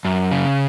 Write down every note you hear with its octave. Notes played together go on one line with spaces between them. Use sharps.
F#2
C#3